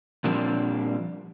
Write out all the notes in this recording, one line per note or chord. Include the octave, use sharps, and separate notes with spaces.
A#2 F3 G3 A#3 C4 D4